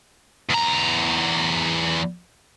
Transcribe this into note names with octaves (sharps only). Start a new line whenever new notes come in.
E2 A#5